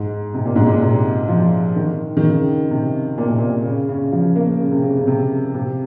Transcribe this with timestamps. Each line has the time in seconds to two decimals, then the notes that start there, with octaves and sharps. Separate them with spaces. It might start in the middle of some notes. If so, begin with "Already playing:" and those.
Already playing: G#2
0.34 C3
0.45 A#2
0.56 G#2
0.67 A#2
0.82 C3
1.29 F3
1.76 D#3
2.17 D#3
2.23 C#3
2.70 C3
3.18 A#2
3.28 C3
3.38 A#2
3.65 C#3
3.89 C#3
4.12 F3
4.36 A#3
4.60 C#3
4.72 C3
4.83 C#3
4.97 C#3
5.07 C3
5.54 C3